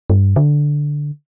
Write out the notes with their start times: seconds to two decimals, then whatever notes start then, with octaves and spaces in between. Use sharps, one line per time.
0.10 G2
0.36 D3